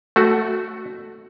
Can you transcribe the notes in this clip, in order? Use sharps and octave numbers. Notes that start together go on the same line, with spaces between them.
A3 F#4